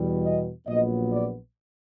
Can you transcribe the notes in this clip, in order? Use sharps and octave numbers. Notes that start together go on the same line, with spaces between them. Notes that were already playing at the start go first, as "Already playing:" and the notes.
Already playing: E2 B2 G3
D#5
A#1 A#2 F#3 B3 D#5
D5